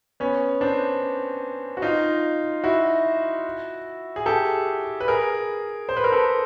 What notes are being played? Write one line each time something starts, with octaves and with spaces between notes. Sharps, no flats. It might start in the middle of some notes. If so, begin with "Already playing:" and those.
B3 C#4
C4 D4
F#4
D#4 F4
E4 F#4
G#4
G4 A4
B4
G#4 A#4
C5
B4
A#4
A4 B4